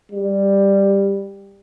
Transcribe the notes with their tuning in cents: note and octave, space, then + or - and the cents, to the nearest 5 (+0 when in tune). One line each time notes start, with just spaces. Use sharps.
G3 +10